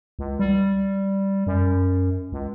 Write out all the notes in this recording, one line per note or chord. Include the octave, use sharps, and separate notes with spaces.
C#2
G3
F#2
C#2